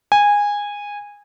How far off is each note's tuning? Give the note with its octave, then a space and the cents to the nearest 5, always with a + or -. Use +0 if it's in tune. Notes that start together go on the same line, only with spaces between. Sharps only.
G#5 -15